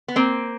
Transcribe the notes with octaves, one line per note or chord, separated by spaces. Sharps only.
B3
A#3 C4